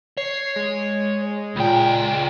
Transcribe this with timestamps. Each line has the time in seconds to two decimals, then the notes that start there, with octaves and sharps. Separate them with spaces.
0.18 C#5 C7
0.56 G#3
1.56 C#2 A#2 G5